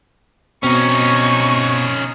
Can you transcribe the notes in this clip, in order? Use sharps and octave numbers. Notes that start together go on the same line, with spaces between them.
B2 C4 C#4 D#4 C#6